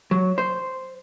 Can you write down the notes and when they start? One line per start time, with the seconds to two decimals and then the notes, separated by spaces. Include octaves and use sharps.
0.11 F#3
0.38 C5